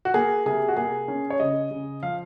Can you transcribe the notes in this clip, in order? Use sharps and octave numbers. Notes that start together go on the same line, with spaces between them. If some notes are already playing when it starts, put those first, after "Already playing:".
F#4
A#3 G#4
C3 G#4
F#4
A#3 G#4
C#4
C#5
C#3 D#5
C#3
F3 F5